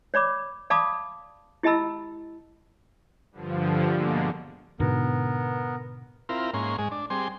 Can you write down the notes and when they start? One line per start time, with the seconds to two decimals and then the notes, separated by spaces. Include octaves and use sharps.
0.14 C#5 D5 B5 D6
0.70 D5 F5 A5 B5 D6 D#6
1.63 E4 G4 D#5 A5 B5 E6
3.32 G2 D3 F3
3.94 B2 D3 G3 G#3 A#3
4.80 G#2 B2 D3 B3 A#4
6.29 C4 E4 F4 A#4
6.54 G#2 A#3 C#4 C6
6.78 G#2 G#3
6.91 D4
7.10 G3 C4 G#4 C6